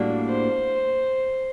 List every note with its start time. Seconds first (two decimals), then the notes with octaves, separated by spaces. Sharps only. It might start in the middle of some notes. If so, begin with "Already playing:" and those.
Already playing: A2 G3 A#3 D4 F#4
0.29 C5